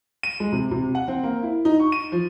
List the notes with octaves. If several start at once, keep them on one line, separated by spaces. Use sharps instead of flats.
D#7
G#3
C3
C3
F#5
C4
A#3
E4
D#4
C#6
D#7
F3